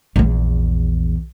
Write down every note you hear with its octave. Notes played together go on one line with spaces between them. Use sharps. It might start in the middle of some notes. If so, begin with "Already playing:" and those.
A#1 E2